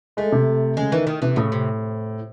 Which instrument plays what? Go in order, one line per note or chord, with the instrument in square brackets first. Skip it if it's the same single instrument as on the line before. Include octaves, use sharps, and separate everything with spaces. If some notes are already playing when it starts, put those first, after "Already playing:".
[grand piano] G#3 [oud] A3
[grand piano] C3
[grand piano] C#3 [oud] G#3
[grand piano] D#3 [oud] E3
[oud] D#3
[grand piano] C3 [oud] E3
[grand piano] A2 [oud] C#3
[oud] C3